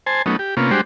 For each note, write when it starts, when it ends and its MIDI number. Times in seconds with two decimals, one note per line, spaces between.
0.06 0.22 72
0.06 0.22 80
0.06 0.22 81
0.26 0.36 54
0.26 0.36 57
0.26 0.36 59
0.26 0.36 61
0.26 0.36 63
0.39 0.55 67
0.57 0.71 48
0.57 0.71 58
0.57 0.71 59
0.57 0.71 61
0.57 0.71 65
0.71 0.81 55
0.71 0.81 56
0.71 0.81 62
0.71 0.81 66
0.71 0.81 67
0.71 0.81 72